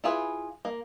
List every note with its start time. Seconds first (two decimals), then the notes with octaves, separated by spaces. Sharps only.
0.04 E4 F4 G#4 B4
0.65 A#3